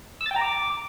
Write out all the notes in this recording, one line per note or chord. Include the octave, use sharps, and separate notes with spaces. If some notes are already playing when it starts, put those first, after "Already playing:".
E6
A6
G5
A#5
D6